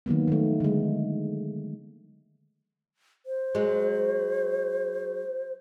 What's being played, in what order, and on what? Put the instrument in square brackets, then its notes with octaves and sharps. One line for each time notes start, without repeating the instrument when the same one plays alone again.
[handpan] D#3 F#3 A#3 B3
D#3 F3 A3
D3 G#3
[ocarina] C5
[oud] F#3 G#3